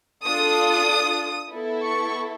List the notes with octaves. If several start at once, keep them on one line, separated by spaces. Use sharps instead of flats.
D4 F4 A4 D#6
B3 E4 A4
C#6